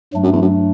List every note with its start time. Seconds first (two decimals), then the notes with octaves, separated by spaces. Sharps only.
0.13 G2 F#3 A3 D4
0.23 F#2
0.33 E2
0.42 F#2